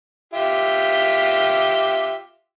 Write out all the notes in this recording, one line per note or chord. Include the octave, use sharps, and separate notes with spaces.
F4 G4 E5